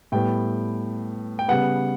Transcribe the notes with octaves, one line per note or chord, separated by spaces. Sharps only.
A2 G3 B3 G5
G5
C#3 G3 B3 F#5